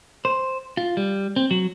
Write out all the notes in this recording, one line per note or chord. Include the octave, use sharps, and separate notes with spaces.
C5
F4
G3
C4
F#3